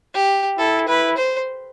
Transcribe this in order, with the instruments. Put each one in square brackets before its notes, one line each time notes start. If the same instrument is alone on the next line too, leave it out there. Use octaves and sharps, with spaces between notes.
[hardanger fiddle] G4
[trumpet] E4 [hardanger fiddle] A4
[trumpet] E4 [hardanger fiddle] B4
[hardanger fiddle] C5